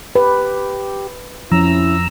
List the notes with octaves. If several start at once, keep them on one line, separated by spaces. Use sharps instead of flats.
G4 B4
F2 F3 C#4 E4 A#5 E6